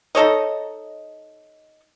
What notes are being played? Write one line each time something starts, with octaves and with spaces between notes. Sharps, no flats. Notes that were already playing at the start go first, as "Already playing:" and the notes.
D#4 A4 C#5 D#5